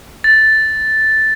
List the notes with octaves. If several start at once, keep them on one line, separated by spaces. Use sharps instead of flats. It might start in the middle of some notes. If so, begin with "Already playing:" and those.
A6